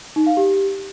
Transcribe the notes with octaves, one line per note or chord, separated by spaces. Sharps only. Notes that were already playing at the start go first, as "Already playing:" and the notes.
D#4
F5
G4